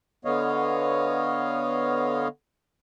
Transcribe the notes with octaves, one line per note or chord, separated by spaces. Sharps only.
D3 B3 C#5 D#5 F5